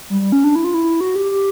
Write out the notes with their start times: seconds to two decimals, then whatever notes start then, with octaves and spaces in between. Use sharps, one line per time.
0.10 G3
0.21 G3
0.32 C#4
0.44 D4
0.56 E4
0.64 F4
0.74 E4
1.01 F#4
1.16 G4
1.31 G4